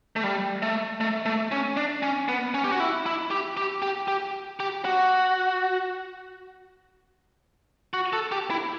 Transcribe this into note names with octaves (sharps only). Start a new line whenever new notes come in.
A3
G3
A3
A3
A3
C#4
D4
C#4
B3
C#4
G4
F#4
E4
E4
G4
G4
G4
G4
G4
F#4
F#4
A4
G4
E4